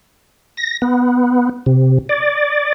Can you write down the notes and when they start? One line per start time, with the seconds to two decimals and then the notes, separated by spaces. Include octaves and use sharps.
0.57 A#6
0.82 B3
1.66 C3
2.09 D5